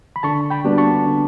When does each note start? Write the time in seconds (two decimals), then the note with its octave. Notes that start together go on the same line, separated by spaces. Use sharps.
0.16 B5
0.23 D3 A5 C#6
0.50 G5 B5
0.64 G3 B3 D4 F#4
0.78 A5 C#6
1.06 D3